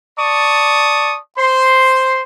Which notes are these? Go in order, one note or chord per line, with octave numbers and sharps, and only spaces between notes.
D5 A5 C#6 D#6
C5 C6